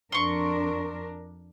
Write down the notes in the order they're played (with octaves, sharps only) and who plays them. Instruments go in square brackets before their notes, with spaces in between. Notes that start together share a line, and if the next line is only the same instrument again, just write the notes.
[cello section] F2 D4 A#4 [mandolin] C6 C#6